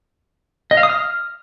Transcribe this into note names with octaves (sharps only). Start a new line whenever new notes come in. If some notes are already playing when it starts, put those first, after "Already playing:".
D#5
F5
D#6
F6